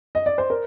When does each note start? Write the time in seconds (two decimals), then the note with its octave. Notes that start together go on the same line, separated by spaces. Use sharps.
0.15 D#5
0.26 D5
0.38 C5
0.50 A#4